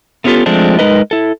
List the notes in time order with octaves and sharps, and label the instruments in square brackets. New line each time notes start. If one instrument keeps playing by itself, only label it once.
[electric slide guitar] A3 B3 C#4 F4 G4 A4
F3 G#3 A3 C4 D4
G#3 D#4 A#4 B4 D#5
E4 A4